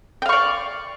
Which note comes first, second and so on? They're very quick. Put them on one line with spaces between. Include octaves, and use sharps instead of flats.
G5 F5 C#6 D5